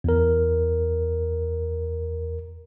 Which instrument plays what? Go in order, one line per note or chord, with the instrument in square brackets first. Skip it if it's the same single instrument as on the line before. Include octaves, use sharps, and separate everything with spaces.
[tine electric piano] E2 A#4